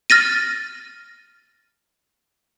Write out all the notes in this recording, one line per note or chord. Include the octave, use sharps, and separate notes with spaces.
F6 A6 A#6 D#7